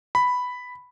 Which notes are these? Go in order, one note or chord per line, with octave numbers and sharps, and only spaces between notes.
B5